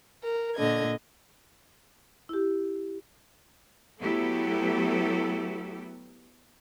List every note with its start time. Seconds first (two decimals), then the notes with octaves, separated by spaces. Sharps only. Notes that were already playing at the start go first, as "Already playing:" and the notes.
0.23 A#4
0.57 A#2 D3 D#5 G#6
2.29 E4 G4
3.99 F#3 A3 B3 E4 G4 A4